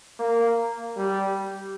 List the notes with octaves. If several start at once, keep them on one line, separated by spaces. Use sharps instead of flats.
A#3
G3